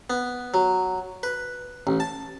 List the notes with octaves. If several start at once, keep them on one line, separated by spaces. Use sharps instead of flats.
B3
F#3
B4
A1
A5